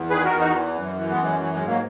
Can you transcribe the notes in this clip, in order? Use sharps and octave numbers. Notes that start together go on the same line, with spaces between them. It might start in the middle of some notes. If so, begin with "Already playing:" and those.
Already playing: E2
D#3 G#4 B4
F#4 A#4
E2
D#4 F#4
E3
F#2
E3
G#3 B3
F#2
G#3
E3 F#3
G#3
G#2
F#3 A#3